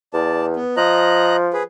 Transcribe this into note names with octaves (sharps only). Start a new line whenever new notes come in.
E2 D5 A5
B3
F3 D#5 A#5 F#6
G#4 B4